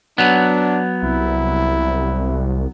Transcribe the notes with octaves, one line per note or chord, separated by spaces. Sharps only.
F#3 B3 D4
C2 E4